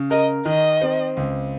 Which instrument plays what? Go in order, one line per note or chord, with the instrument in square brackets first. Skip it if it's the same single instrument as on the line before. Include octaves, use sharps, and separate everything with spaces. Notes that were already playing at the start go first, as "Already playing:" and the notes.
Already playing: [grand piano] C#3
[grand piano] A#4 [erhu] D#5
[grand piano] D#3 [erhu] D#5
[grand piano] C4
C#2